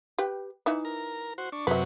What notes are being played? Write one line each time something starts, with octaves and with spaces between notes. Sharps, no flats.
G4 B4 G5
E3 D#4 E5
A#4
F#4 C5
D4 C#6
F#2 C3 F#3 B4 E5